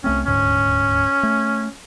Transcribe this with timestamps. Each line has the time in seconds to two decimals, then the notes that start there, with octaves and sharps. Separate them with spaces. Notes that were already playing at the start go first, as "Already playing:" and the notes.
0.04 C2 A3 C4 C#4
0.26 D#1 D2 G#2 C#4
1.23 A3